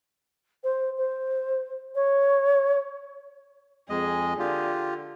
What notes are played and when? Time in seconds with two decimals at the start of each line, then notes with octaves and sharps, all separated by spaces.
0.64 C5
0.98 C5
1.95 C#5
3.90 F2 G#3 G#4 D#5
4.39 D3 F4 G4